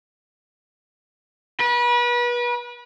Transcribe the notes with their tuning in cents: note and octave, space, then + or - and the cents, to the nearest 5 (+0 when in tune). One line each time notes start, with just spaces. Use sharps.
B4 -35